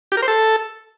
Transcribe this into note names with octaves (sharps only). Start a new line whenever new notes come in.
G4
A#4
C5
A4